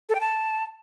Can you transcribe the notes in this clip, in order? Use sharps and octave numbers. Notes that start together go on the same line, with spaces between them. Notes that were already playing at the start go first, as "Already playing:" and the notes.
A4
G5
A5